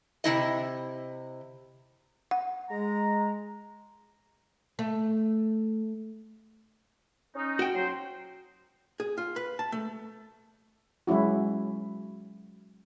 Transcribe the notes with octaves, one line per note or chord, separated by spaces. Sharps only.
C3 G3 E4 D#5
F#5
G#3 A#5
A3
C#4 D#4
F#4 G5
F#3 C5
G#4
F4
B4
A5
A3
F#3 G#3 C#4 E4 F#4